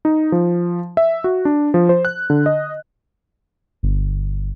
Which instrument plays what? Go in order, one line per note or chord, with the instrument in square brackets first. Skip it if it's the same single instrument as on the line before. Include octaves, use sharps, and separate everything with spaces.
[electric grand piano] D#4
F3
E5
F#4
D4
F3
C5
F#6
D3
D#5
[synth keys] G1